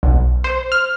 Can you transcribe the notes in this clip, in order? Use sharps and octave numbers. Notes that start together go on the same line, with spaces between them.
B1
C5
F6